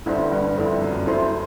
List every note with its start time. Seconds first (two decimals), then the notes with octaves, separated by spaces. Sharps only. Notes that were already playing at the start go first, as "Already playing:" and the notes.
0.06 G1 G2 E4 A4 C5
0.31 G1 G2
0.57 F2 E4 A4 C5
0.82 F#2
1.07 F#2 E4 A4 C5